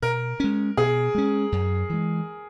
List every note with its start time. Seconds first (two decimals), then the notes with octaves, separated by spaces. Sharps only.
0.02 B2 A#4
0.40 G#3 C#4
0.77 B2 G#4
1.15 G#3 C#4
1.52 F#2
1.90 E3 G#3